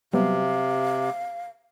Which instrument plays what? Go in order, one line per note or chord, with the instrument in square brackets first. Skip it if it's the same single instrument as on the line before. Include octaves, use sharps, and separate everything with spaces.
[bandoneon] C3 [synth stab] F#3 G3 B3 [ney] F5